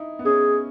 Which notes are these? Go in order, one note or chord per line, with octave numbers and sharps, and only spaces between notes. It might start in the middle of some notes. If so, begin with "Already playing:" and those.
Already playing: D#4 E4
B3
C#4 G#4